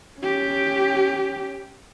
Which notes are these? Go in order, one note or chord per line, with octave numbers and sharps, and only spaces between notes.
C#4 G4